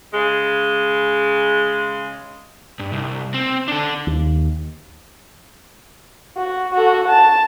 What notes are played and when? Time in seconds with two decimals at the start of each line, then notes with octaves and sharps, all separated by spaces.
0.14 C#3 G#3
2.79 G2
2.92 C2
3.34 C4
3.68 D4 A4
4.07 D#2
6.37 F#4
6.74 F#4 A4
7.08 A5